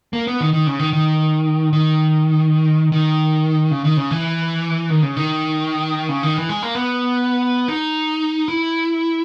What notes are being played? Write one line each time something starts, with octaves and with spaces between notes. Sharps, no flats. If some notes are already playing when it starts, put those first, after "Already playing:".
A#3
B3
D#3
D#3
C#3
D#3
D#3
D#3
D#3
C#3
D#3
C#3
E3
D#3
C#3
D#3
C#3
D#3
E3
G#3
A#3
B3
D#4
E4